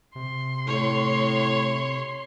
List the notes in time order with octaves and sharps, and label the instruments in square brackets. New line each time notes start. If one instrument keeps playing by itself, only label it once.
[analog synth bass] C3 [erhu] C6
[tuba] A2 [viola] C#5